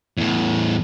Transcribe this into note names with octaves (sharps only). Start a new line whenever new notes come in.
E2 A2